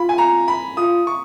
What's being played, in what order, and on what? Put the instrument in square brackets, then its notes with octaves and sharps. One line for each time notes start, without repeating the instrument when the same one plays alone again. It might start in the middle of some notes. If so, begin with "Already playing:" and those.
Already playing: [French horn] F4 [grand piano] B5
[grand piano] G#5
A#5
B5
[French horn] F4 [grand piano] D#6
[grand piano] C#6